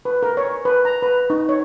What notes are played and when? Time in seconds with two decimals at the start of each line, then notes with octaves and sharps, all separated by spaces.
0.05 B4
0.23 A#4
0.37 C#5
0.65 B4
0.85 A#5
1.02 B4
1.30 D#4
1.49 C#5